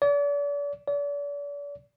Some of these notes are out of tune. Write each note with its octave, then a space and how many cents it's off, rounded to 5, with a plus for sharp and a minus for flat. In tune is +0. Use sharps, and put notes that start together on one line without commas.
D5 -40
D5 -40